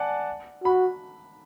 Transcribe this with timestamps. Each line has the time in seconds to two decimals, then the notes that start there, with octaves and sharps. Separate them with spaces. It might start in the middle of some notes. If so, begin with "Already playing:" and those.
Already playing: D5 F#5 G#5 A5
0.64 F#4 B5